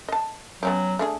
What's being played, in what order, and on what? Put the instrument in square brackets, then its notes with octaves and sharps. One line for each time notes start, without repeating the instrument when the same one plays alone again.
[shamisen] D#5 A5
[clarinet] F#3 [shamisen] B3 C#4 G4
[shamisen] A3 D4 G#4